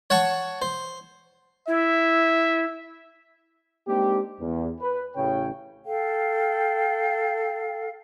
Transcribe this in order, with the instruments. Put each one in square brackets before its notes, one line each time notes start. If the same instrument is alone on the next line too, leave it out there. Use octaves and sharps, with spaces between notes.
[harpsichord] C#5 F#5 A5 C#6
C5
[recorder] E4 [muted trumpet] E5
[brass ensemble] G#3 A#3 C4 D4 D#4 G4
E2
B4
A1 C#3 C#5 G5
[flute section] A4 F5 G5